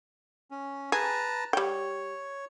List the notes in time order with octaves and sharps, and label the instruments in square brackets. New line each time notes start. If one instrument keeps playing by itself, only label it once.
[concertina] C#4
[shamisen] G#4 [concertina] B4 A5 A#5
[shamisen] G3 G5 [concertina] C#5